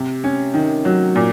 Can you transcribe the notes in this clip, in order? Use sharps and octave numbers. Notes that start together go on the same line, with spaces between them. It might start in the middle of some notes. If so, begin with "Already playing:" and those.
Already playing: C3
C#4
D#3
F#3
A#2